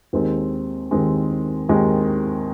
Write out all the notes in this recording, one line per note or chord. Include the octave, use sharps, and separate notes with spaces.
D#2 D#3 G#3 C4
D#2 D#3 G#3 C4
D#2 D#3 G#3 C4